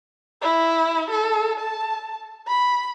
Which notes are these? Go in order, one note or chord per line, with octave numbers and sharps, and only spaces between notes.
E4
A4
A5
B5